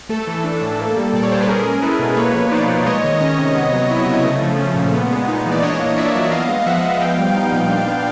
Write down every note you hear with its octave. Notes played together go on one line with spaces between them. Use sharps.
A3 A4
E3
D4
A2
A#3
G3
A#2 D5
C#5
A#2 C5
B4
C#4 G#4 A#4
G#3
E4 A4 B4
B2
A#3 B4 C#5
F3
D#4 C5 D5
A#2
G#3 C#5 D#5
D#3
C#4 C#5 D#5
C3
B3
F#3
E4
C#3
A3
F3
C#4
A#2
B3
G#3
D#4
E3
D5
D4 C#5 D#5
A#3
F4 D5 E5
F#3
B3 D#5 F5
G#3
F3 E5 F#5
F3
B3 F5 G5
G3
D#4
A#2
D4
B3